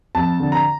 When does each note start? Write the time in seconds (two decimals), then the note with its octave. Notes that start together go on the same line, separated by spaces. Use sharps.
0.15 F2 A5
0.40 D3
0.52 A#5